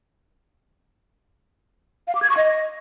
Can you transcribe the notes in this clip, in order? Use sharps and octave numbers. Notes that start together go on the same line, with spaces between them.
F5
D6
G#6
C#6
D#5